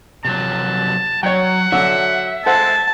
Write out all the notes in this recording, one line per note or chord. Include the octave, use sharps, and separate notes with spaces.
C3 F3 F#3 A5
F#3 C#5 F#5 G5
D3 F#3 F#4 E5
G#3 A4 C5 F#5 A5